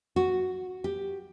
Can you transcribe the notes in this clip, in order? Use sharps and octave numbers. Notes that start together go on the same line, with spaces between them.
F#4
G4